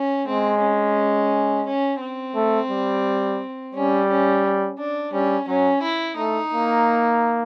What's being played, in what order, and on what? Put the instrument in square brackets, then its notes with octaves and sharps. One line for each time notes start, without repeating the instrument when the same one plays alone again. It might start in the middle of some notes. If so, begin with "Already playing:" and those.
Already playing: [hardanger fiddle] C#4
[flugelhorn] G#3 [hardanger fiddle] C4
[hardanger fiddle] C#4
C#4
C4
[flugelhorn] A3
G3
[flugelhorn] G3 [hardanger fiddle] C#4
[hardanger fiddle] C#4
D4
[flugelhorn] G3 [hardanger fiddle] C#4
[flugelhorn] F#3 [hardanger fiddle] C#4
[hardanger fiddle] E4
[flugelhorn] A3 [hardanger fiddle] D#4
[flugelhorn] A#3